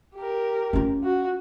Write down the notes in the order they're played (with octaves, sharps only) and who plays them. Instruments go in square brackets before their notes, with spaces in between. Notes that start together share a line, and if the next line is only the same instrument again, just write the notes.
[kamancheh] G4 A#4
[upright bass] C#4 F4
[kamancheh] F#4